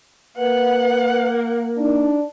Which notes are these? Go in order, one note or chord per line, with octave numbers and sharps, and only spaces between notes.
A#3 B4 F#5
D4 D#4